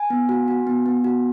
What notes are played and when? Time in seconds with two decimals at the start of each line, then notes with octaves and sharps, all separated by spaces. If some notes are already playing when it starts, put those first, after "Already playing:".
Already playing: G#5
0.10 B3
0.29 F#4
0.48 F#4
0.67 B3
0.86 B3
1.04 F#4